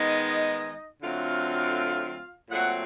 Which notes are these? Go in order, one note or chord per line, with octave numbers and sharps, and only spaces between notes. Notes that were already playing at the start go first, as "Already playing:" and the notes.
Already playing: D#3 G#3 B3 D#4 D#5
D3 F#3 A3 C4 F4 F5
A#2 F#3 A3 C4 F#4 F#5